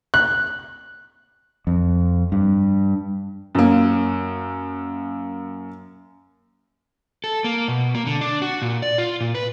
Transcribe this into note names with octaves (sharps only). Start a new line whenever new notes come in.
F#6
F2
G2
F#2 A#3
A4
A#3
B2
A#3
D3
D4
F#4
A#2
D5
F4
A#2
B4